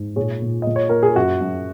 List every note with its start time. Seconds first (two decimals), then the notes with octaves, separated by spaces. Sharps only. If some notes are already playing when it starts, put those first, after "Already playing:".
Already playing: G#2
0.16 A#2 G#4 C#5
0.42 A#2
0.62 A#2 D#5
0.76 C#5
0.89 A#3 A#4
1.03 G#4
1.15 F#2 F#4
1.41 F#2